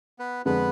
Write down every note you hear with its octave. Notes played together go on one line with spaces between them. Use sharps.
B3 B4
F2 D3 G#3 B3 D4 G#4 B4